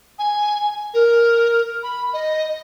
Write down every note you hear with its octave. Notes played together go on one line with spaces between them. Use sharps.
G#5
A#4
B5
D#5